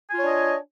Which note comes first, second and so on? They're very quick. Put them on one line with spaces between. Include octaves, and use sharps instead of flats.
G#5 F4 C#5 D4 D#5